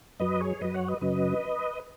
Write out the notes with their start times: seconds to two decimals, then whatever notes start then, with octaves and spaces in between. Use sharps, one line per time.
0.20 F#2 F#3 B4 D#5
0.41 G#4 C#5
0.61 F#2 F#3 B4 D#5
0.74 C#5 F#5
0.88 B4 D#5
1.01 F#2 C#3 F#3 B4 D#5